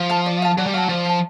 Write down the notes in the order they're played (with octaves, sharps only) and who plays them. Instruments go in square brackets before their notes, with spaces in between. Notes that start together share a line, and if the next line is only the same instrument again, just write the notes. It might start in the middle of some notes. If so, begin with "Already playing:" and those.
Already playing: [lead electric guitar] F3
[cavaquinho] F5 A5
D5
F5 A5
[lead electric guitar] F#3 [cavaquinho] D5
[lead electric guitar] G3
[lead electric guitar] F#3 [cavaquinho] F5 A5
[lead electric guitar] F3 [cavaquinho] D5
[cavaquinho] F5
A5